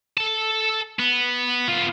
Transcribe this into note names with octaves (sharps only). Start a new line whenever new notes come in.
A4 A5
B3
B3 F4